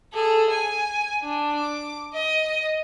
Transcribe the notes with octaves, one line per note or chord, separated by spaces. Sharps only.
G#4 A4
G#5
D4
D6
D#5